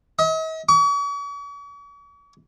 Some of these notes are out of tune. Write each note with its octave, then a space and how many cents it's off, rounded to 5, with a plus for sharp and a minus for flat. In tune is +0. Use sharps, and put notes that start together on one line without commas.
D#5 +45
C#6 +45